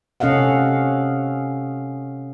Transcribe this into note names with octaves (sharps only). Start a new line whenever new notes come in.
C3 C#4 A4 D#5 F5 F#5